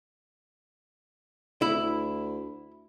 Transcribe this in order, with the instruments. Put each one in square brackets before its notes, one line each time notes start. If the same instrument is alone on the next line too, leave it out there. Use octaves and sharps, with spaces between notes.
[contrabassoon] D2 [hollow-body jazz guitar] E4